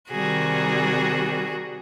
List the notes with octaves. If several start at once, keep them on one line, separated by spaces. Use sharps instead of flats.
C3 D#3 G3 F#4 G#4